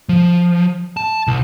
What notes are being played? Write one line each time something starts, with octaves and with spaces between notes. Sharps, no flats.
F3
A5
C2